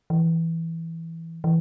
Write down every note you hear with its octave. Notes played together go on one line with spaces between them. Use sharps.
E3
E3